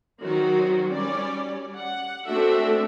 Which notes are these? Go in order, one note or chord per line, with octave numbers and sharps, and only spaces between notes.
D#3 F#3 C4 F#4 C5
G3 C#4 D5
F#5
A3 C4 D4 F#4 A4 E5